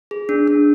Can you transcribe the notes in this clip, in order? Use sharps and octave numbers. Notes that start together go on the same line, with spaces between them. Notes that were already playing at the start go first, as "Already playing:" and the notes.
G#4
D4
D4